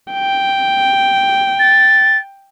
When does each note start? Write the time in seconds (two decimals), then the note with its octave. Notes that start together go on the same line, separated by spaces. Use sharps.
0.14 G5
1.59 A6